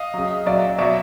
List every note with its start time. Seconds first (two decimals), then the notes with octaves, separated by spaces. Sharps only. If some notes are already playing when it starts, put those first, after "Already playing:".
Already playing: D#5 F5
0.14 C#3 F#3
0.46 A#2 F#3 D5 E5
0.78 B2 F#3 D5 E5